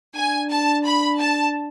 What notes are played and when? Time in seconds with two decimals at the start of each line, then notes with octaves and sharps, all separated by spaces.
0.15 D4 G#5
0.50 A5
0.85 B5
1.19 A5